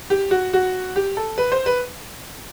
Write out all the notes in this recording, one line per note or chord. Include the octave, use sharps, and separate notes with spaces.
G4
F#4
F#4
G4
A4
B4
C5
B4